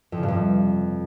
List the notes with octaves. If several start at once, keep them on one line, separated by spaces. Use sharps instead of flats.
F2
C#3
G2
F2
C3